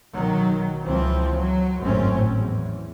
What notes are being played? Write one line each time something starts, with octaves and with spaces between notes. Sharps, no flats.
B1 D#3 F#3
C#2 E3 F3 C4
F#3
G#1 F#2 A2 C4 C#4
E2